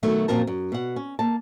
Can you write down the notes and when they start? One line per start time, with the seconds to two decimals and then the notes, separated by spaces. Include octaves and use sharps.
0.03 B2 D#3 F#3 A3
0.28 F#2 A#2 F3 C4 A#4 A5
0.47 F#2
0.72 B2 F#5
0.96 C#4
1.19 A#3 A5